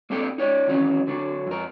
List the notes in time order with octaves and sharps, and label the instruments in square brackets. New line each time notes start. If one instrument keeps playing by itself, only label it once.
[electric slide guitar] A#3 C4 D4 G4 A4
D#4 C#5 D5
D#3 E3 F#3 C#4
D3 F#3 D4
F2 A#4